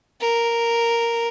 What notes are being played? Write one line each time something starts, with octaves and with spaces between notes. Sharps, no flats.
A#4